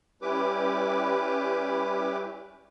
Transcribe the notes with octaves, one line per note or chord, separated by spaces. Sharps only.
G3 C#4 E4 G4 B4 D6